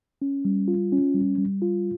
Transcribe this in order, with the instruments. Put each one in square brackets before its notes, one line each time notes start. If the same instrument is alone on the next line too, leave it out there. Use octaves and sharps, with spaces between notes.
[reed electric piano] C#4
G3
F4
C#4
G3
G3
F4